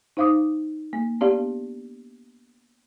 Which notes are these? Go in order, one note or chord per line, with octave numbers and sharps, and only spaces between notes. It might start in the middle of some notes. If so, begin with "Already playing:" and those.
D#4 C5 F5 D6 D#6
A#3
B3 D4 G4 D5 F5